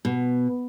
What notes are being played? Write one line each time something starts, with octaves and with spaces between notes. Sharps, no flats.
B2